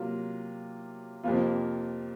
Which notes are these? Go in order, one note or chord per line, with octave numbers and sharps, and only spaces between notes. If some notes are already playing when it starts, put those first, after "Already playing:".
Already playing: C3 F#3 A#3 F4
F2 C3 F3 A#3 F4